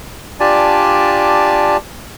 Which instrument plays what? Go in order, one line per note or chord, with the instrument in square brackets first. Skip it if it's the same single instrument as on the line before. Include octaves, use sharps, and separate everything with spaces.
[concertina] D4 F4 G4 D5 G#5 A5